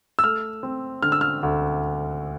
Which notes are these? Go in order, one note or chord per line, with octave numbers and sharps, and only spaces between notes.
E6
A3 F6
C4
D3 F6
E6
F6
D2